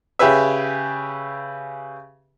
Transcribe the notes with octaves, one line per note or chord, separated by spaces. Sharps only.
C#3 G4 G#4 B4 E5